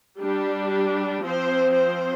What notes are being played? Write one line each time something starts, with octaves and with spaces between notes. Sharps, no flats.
G3 D4 G4
G4
F3 C4 C5
C5